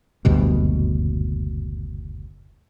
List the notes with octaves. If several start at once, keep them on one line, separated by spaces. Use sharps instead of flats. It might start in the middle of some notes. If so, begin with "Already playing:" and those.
F#1 D2 G2 B2